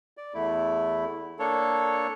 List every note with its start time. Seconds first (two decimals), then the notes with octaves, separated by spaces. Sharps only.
0.17 D5
0.34 E2 A3 E4
1.39 A#3 D4 A4 C#5